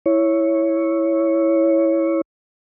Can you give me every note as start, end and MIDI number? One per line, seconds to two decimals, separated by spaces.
0.06 2.21 64
0.06 2.21 73